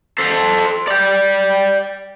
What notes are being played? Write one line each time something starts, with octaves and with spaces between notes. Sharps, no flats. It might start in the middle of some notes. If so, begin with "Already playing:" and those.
A4 C5
D5 G5